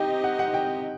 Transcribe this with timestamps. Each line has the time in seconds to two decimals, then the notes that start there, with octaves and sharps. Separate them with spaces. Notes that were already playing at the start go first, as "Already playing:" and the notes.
Already playing: C4 D#4 G4 D#5 G5
0.24 F#5
0.39 F#5
0.54 G5